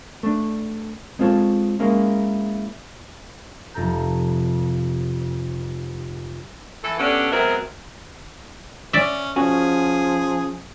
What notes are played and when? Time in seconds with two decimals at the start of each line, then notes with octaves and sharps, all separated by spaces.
0.23 A3 D4
1.19 G#3 C4 F4 G#4 A4 C#5
1.80 G#3 A#3 C#4 E4
3.74 F1 F2 C3 A4 A#5 G6
6.83 E3 A4
6.98 B3 C#4 D4 G4 A4
7.31 F#3 G#3 B3 C4 A#4 E5
8.93 C#4 D5 E5
9.36 F3 C#4 F#4 G#4